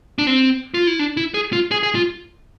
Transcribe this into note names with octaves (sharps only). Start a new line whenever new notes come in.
D4
C4
F4
E4
D4
E4
G#4
F4
G#4
G#4
F4